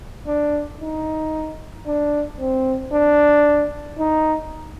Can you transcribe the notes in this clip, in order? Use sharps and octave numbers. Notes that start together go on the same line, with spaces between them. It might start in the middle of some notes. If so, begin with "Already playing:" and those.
D4
D#4
D4
C4
D4
D#4